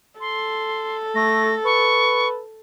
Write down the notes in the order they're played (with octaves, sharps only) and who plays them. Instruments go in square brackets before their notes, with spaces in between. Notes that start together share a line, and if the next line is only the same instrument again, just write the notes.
[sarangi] A4 [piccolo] C6
[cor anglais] A3 [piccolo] A#6
[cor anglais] B4 [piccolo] C#6